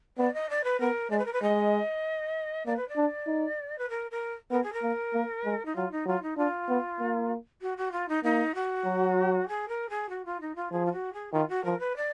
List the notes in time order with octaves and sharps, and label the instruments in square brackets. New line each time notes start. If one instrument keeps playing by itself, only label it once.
[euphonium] B3 [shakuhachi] D5
[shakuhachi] D#5
D5
B4
[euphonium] B3 [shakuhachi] A#4
[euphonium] G#3 [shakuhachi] D5
[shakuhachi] B4
A#4
B4
[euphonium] G#3 [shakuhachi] D#5
[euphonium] A#3 [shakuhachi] D5
[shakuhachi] B4
D5
[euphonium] D4
D#4
[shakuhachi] B4
A#4
A#4
[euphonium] B3 [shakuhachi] A#4
[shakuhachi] G#4
A#4
[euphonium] A#3
A#3
G#3
[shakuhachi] D#4
[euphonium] F#3 [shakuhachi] F4
[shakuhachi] D#4
[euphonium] F#3 [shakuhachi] F4
[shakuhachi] D#4
[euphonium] D4 [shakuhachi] F4
[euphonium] B3
A#3
[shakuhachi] F#4
F#4
F4
D#4
[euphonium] A#3 [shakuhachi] D#4
[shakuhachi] F#4
[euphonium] F#3
[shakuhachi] G#4
A#4
G#4
F#4
F4
D#4
F4
[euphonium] F3 [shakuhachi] G#4
[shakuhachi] F4
F#4
G#4
[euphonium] D#3 [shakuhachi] F4
[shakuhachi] F#4
[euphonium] F3 [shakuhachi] A#4
[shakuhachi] B4
D5